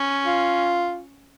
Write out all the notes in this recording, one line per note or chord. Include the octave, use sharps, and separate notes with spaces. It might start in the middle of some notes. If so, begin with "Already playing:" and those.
Already playing: C#4
F4